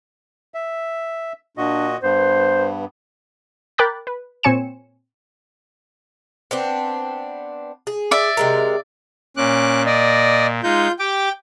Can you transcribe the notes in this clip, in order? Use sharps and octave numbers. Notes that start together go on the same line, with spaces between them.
E5
A#2 D4 F#4 D#5
G2 B3 C5
A#4 G5 B5 D6 F#6 A6
B4
A#2 C4 C#5 G#5 C#7 E7
B3 C4 D4
G#4
D5 E5
C3 G#3 A#4
A#2 C#4 D6 F#6
D5 D#5
G#3 D#4 F4 G6
G4 G5 D6